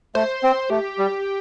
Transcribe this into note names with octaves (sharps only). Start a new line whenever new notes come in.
A3 C5
C4
A3 G4
G3